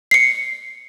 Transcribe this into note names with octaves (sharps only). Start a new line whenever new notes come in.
C7 C#7